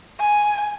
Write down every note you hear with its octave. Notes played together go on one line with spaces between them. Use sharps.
G#5